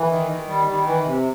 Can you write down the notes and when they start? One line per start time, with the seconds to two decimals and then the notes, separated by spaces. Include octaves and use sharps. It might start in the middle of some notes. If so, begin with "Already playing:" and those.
Already playing: E3
0.10 D#3
0.29 D#3
0.48 G3
0.67 D#3
0.86 E3
1.05 C3